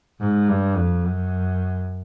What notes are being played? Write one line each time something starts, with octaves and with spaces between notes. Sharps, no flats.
G#2
G2
F2
F#2